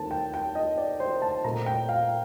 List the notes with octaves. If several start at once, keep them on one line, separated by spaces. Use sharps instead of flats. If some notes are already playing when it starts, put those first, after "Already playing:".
Already playing: D#2 D#3 A3 C4 A5
G5
G5
D#5
D5
C5
A5
A#2 A3 C4 A#5
G5
F5